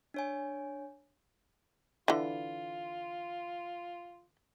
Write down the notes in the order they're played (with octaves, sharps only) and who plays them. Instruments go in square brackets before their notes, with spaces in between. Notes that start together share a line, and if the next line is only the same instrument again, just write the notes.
[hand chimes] D4 C#5 G#5
[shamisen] D3 E3 [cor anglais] F4